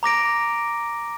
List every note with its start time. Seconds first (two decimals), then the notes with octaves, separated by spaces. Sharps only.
0.03 A#5 D6 A#6 D7